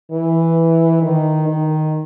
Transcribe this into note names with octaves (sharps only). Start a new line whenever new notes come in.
E3
D#3
D#3